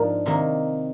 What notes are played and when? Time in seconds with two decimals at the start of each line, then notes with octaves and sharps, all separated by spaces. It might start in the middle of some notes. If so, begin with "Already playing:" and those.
Already playing: G#2 F3 A#3 D4 F4
0.26 C3 D#3 A#3